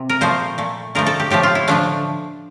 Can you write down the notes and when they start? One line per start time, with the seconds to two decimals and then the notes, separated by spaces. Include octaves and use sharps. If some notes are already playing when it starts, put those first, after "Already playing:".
Already playing: C3
0.09 A#4
0.21 A#2 F3 A3 C5
0.58 A#2 A3
0.95 D3 F3 A3 A#4
1.07 A4
1.20 G4
1.30 A2 F3 A3 G4
1.43 F4
1.55 E4
1.68 D3 F3 A3 D4